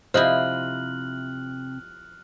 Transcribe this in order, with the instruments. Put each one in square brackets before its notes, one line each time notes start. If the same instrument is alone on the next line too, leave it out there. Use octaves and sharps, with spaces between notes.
[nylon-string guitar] C3 [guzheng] F3 E4 [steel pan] C5 D#5 [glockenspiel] F6 F#6 F#7